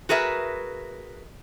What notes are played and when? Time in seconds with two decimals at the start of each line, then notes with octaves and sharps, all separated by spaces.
0.09 F#4 G#4 A#4 B4 E5